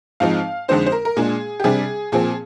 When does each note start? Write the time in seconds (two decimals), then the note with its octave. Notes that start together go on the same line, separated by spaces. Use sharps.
0.20 G#2 F3 C4 D#4 F5
0.68 F2 D3 G#3 C4 D#4 C5
0.86 C5
0.92 A#4
1.05 A#4
1.17 A#2 G#3 D4 G#4
1.60 G4
1.64 C3 G3 D4 G#4
2.12 A#2 F3 C4 G#4